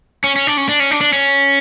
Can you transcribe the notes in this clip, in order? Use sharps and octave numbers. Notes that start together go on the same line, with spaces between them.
C#4
C#4
D4
C#4
D4
C#4
D4
D4
C#4